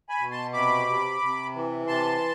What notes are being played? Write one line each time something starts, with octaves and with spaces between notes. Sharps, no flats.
G#5 B5
B2
A5 C6
C3 B5 D6
C3
C3
E3
C3 A5 C6